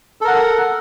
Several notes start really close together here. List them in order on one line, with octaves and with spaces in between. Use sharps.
A4 A#4 F#5